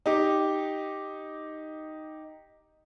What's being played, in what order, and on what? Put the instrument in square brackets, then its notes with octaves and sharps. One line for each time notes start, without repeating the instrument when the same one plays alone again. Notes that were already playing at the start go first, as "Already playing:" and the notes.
[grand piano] D#4 G4